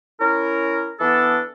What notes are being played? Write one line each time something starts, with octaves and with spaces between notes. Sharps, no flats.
C#4 E4 A#4
E3 B3 D4 A4